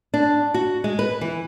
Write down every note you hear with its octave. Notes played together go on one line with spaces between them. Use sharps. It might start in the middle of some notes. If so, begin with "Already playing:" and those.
D4
F#4
G#3
B4
E3